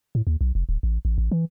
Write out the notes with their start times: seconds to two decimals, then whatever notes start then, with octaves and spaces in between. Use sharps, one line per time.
0.15 A2
0.27 D#2
0.41 B1
0.55 F1
0.69 D1
0.83 A1
1.05 A1
1.18 A1
1.32 E3